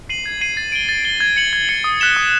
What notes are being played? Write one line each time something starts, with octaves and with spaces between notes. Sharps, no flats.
C7 D#7 F#7
G#6
C7 D#7 F#7
A6
D7 G7
A6
D7 G7
G#6
C#7 F#7
G#6
C#7 F#7
D#6
F#6 B6 E7 G7
D#6